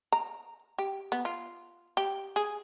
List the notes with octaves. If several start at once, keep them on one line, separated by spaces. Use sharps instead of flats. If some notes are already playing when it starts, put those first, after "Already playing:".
A#5
G4
B3
F4
G4
G#4